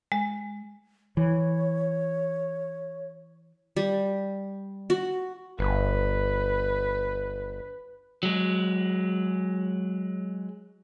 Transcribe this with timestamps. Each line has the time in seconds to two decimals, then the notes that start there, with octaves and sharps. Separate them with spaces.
0.12 G#3
1.17 E3 C#5
3.77 G3
4.90 F#4
5.59 G1 B4
8.23 F#3 G#3